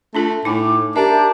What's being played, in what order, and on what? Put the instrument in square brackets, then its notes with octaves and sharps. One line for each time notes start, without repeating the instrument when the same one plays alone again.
[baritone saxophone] A3 [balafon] D4 F4 A4
[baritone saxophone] A2 [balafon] D#4 G#5 [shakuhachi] D6
[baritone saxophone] D4 [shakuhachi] G4 [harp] A#4 A5 [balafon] E5